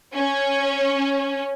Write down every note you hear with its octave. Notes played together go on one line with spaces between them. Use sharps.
C#4